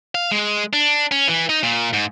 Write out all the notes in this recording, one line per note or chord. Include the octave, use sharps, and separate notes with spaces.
F5
G#3
D4
C#4
E3
D#4
A#2
G#2